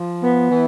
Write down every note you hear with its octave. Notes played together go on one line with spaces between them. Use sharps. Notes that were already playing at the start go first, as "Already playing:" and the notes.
Already playing: F3
B3
E3